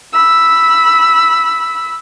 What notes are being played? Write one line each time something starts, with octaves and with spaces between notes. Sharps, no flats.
B5 E6